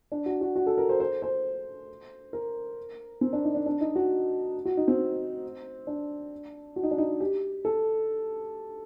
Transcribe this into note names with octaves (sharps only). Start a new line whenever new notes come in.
D4
F#4
F#4
F#4
A4
A#4
C5
C5
C5
A#4
C4
D4
D#4
D4
D4
D#4
F#4
F#4
D#4
C4
D4
F#4
D#4
D4
D#4
G4
A4